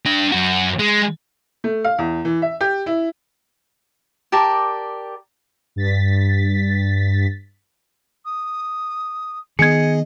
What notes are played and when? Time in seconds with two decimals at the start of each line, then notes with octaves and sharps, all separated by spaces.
0.06 D4 G5
0.32 F#2 F#4
0.79 G#3
1.64 A3
1.84 F5
1.99 E2
2.25 E3
2.42 E5
2.61 G4
2.86 E4
4.32 G4 A#4 D5 A5
5.76 G2 A6 B6
8.25 D#6
9.59 D#3 B3 G#4 D#5 G#6 C#7